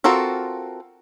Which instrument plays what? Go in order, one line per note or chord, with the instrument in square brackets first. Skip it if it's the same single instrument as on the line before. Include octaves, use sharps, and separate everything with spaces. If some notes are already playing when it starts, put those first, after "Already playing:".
[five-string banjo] C4 F4 F#4 A4 A#4